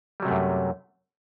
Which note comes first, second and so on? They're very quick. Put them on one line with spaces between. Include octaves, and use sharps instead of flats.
G3 F#3 C3 A3 F#2